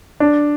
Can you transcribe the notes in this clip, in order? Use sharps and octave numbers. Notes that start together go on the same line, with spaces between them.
D4